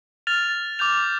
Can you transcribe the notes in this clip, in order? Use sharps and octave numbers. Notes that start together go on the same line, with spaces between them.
F6 A6 F7
D6 G6 F7